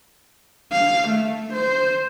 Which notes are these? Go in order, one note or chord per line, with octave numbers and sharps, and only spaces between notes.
F5
A3
C5